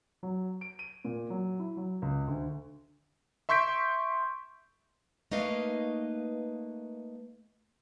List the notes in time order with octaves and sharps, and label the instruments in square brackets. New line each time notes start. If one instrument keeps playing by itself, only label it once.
[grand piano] F#3
D7
D#7
A#2
F#3
E4
F#3
C#2
D2
[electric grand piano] E5 C6 C#6 G6 B6 D7
[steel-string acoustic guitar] A3 A#3 D#4 B4 D#5 F5